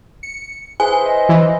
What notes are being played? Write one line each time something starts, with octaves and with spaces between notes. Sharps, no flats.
C#7
E4 G#4 B4 C5 G#5
D#5
E3